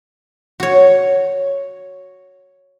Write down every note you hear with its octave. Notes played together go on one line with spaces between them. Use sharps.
F#4 C#5